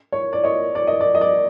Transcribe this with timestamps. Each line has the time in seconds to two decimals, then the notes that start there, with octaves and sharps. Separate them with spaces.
0.12 C#5
0.33 D5
0.44 C#5 D#5
0.75 D5
0.87 D#5
1.01 D5
1.15 D#5
1.21 D5